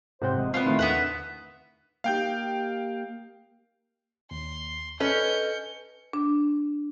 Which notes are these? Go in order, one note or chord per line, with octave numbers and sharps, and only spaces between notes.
G#2 C3 C5 F#5 G5
D#1 G#3
A#2 B3 C4 E4 F4
D2 A2 D#3 A3
D#2 B3 E5 F#5
A#3 D#4 G4 F5 G5 G6
D#2 C6
C#4 A4 B4 D#5 G6 C#7
D4